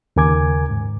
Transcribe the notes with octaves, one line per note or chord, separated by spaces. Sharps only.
D#2 C#3 A#4 G#5 D6 G#6
G#2